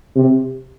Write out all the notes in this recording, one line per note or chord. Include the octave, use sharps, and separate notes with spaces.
C3